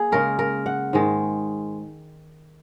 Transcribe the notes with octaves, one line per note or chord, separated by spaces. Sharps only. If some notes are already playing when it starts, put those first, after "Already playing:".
Already playing: A#3 G#4
C#3 G#3 A#4
A#4
F#5
G#2 D#3 G#3